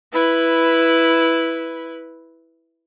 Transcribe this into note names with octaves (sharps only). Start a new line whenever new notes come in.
E4 B4